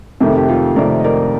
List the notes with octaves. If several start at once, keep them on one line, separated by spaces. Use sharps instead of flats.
F2 C3 D#3 A3 G4
A4
G4
F4 A4
F2 C3 D#3 A3 A#4 D5
D#5
A#4 D5